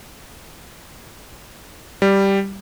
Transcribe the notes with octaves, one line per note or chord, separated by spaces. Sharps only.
G3